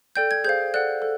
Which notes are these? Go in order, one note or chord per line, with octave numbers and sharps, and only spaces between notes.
A4 D5 G5 G6
G#6
G#4 C5 F5 G6
A4 D5 F#5 F#6
A4